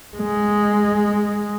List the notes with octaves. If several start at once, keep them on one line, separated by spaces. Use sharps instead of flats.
G#3